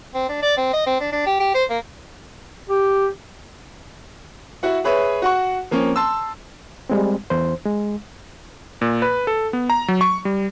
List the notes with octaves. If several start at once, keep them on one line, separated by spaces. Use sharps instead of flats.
C4
D4
D5
C4
D#5
C4
D4
D4
G4
G4
C5
A#3
G4
E4 F#4 F#5
G#4 B4 C#5 E5
F#4 F#5 C#6
F3 A#3 C4 C#4
A5 C6 E6
G3 G#3 C4
E2 C5
G#3
A#2
B4
A4
B3
A#5
F#3
C#6
G3